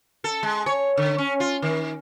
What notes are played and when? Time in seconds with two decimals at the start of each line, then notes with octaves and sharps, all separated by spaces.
0.24 A4
0.43 G#3
0.66 C#5
0.97 D3
1.18 C#4
1.40 F4
1.62 D#3